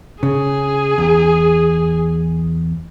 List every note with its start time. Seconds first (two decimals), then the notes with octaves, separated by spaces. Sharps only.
0.23 C#3 G#4
0.98 E2